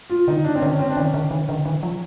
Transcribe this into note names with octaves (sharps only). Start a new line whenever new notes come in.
F4
D3 D#4
D4
C4
D3 C#4
C4
D4
D#3 C#4
D3
D#3
D3
D#3
F3